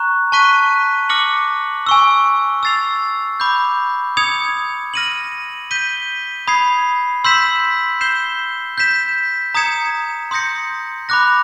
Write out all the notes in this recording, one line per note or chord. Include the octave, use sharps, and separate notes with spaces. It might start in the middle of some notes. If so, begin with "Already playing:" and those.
Already playing: A#5 C#6 F#6
A5 C#6 F#6 B6 D#7
D6 F6 A#6 C#7 F#7
G#5 C#6 E6
E6 A6 C7 F7
B5 D6 G6
D#6 G#6 C#7 F7
F6 A#6 D#7 F#7
G6 B6 D#7 G7
B5 D#6 G#6 C7
C6 E6 G6 B6 E7
G6 C7 E7 G7
G6 B6 E7
A#5 D#6 G#6 C#7 E7
C6 D#6 G6 A#6 C#7
B5 D6 F#6 A#6